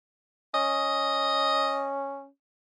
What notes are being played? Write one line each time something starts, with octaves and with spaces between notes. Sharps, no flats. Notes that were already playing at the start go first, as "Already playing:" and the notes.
C#4 D#5